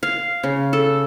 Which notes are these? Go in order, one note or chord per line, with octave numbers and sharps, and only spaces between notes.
F5
C#3
A4